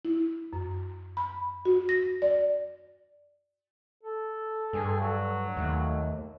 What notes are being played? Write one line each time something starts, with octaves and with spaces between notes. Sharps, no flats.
E4
F#2
B5
F#4
A#6
D5
A4
G2 G#4
F#3
D#2 A3